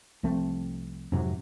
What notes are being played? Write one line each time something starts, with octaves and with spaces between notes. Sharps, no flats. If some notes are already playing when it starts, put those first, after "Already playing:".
C2 F3 A3 C4
F2 G#2 C3 F#3